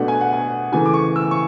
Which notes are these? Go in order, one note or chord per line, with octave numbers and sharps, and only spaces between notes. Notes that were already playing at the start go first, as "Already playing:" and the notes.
Already playing: B2 A3 D4 F#5
G#5
F#5
G#5
C#3 E3 A3 G#5
D6
C#6
E6
C#6